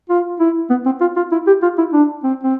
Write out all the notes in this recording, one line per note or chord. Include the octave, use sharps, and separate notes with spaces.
F4
E4
B3
C4
F4
F4
E4
G4
F4
E4
D4
C4
C4